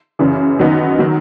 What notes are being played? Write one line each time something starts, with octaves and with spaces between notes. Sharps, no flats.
F#2 C#3 E3
F#2 D#3 F#3 B3 D#4
D#3 F#3